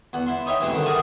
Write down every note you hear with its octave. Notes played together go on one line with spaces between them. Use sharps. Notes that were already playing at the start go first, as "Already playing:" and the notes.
E2 F#5
E4 C6
D#4 C#5 E5 G5
D2 G2 C3 E3
G2 D3 D#3
F#4 G#4 A#4 D5 G#5